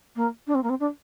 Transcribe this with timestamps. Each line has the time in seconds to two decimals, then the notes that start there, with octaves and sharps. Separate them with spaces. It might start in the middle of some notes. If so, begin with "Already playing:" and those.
0.15 A#3
0.47 D4
0.54 C4
0.63 A#3
0.69 C4
0.80 D4